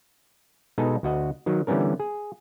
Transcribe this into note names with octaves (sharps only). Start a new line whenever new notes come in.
B2 G#3 D#4 G#4 A4
D2 F#4 D#5 F#5
D#3 F#3
D3 E3 G3 B3 C#4 A#4
G#4